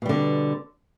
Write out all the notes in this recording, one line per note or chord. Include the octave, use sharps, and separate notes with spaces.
B2 D3 G3